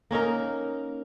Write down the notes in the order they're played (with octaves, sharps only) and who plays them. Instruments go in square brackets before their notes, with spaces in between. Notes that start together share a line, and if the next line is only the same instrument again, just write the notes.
[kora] A#3 C#4 D#4 A#4